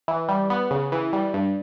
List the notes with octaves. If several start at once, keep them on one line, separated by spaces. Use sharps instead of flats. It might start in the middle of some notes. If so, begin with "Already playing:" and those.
E3
G3
B3
C#3
E3
G3
G2